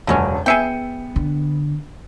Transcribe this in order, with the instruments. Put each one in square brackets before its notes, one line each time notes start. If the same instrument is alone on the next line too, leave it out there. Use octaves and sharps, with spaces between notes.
[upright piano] E1 C#2 F#2 [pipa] D3 F#3 C#4
[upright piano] B3 C#7 D#7 [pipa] G#4 E5 G5
[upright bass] D3